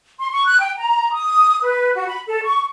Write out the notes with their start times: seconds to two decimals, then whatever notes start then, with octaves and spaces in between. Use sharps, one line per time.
0.19 C6
0.31 C#6
0.45 F#6
0.60 G5
0.77 A#5
1.13 D#6
1.61 B4
1.94 F#4
2.07 B5
2.27 A4
2.44 C#6